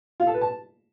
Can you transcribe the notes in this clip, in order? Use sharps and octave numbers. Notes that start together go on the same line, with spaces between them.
F4
A4
B4
A5